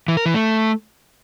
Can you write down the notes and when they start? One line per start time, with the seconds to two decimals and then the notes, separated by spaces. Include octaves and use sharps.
0.08 E3
0.17 A#4
0.26 E3
0.34 A3